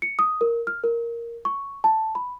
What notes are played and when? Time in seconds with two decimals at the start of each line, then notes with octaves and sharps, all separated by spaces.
0.02 C#7
0.19 D#6
0.41 A#4
0.67 F6
0.84 A#4
1.45 C#6
1.84 A5
2.15 B5